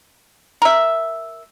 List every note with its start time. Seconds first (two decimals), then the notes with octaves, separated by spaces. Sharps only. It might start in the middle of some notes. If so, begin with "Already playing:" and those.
0.62 A#4 E5